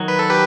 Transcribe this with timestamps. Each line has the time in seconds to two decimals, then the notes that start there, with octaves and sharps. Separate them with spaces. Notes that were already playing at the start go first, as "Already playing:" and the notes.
Already playing: D#3 F#3
0.08 B4
0.19 A4
0.30 G4 B4